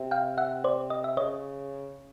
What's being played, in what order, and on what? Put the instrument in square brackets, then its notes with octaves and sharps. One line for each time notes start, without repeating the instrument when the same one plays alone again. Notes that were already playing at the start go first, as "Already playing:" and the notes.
Already playing: [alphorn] C3
[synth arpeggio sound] F5 G5
E5 F#5
C5 D5
D#5
E5
[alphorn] C#3 [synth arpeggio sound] C#5 D#5